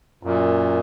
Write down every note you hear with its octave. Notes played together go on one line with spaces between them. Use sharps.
F#2 A#2